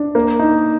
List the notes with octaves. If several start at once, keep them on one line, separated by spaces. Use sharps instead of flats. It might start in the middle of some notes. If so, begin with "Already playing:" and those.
Already playing: D4
A#3
D#4